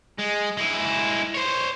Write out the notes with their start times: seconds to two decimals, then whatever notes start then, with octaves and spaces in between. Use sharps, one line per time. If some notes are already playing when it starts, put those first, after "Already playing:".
0.19 G#3
0.57 G#3 E4
1.35 C5 C#5